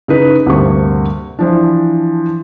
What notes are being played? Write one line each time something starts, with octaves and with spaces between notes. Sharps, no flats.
C#3 D#4 B4
D2 G2 C3 A#3 C#6
E3 F3 D4